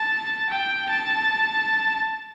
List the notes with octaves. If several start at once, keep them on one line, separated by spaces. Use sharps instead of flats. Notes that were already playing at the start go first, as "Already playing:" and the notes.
Already playing: A5
G5
A5